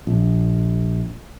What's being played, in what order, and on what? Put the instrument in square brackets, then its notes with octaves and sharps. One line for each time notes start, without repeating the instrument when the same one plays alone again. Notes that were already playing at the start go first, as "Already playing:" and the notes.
[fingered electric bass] A#1